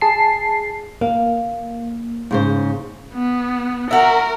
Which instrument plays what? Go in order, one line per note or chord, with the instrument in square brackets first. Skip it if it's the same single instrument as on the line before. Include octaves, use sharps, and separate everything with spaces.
[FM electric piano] G#4 A5 C7
[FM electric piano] A#3 [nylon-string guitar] F5
[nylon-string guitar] G#2 C#3 C5
[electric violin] B3
[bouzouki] F#4 E5 [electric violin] A#4